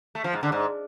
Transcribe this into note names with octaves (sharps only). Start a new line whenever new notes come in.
A3
F3
G#2
D3
G#2